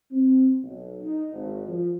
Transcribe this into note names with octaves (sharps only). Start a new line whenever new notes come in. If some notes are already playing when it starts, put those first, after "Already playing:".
C4
B1
D#4
G#1
F3